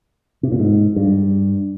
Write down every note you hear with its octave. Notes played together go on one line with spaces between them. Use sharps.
C3
A#2
G#2
G2